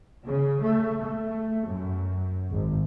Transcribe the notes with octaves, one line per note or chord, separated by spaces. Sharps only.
C#3
A3
A3
F#2
G#1